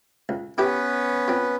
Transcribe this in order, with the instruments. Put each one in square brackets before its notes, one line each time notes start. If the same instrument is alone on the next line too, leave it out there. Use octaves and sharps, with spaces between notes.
[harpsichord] C#2
[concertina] B3 C#4 B4 [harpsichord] E4 G4 G5
[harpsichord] C4 F4